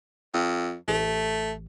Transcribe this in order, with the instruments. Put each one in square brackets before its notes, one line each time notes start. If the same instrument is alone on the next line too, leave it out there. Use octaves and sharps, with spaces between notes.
[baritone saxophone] F2
[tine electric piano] A1 [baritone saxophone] A3